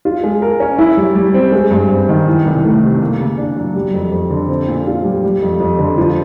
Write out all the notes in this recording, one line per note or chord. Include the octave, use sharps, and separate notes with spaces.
F4
G#3
A#4
C#4
E4
G3
G3
C4
G#3
G2
C4
D#3
E3
C2
A3
C3
A#3
C#3
D4
F#3
G3
F2
F2
D3
C4
A#2
F4
G3
G3
F2
F2
D3
F3